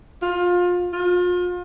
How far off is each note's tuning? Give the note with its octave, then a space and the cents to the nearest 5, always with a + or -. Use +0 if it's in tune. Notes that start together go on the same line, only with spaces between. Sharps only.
F4 +25
F4 +35